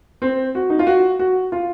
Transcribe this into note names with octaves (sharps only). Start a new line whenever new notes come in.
C4
F#4
D#4
F4
F#4
F#4
F4